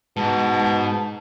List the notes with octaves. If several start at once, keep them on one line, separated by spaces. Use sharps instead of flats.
G#2 B2 A5